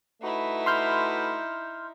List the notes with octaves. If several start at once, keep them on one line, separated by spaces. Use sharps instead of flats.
A3 D#4 E4 F#4 B4
C6 F6 G6